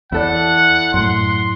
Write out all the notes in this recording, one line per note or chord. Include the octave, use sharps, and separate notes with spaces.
E2 E4 A4 D5 F#5
F#2 A2 C6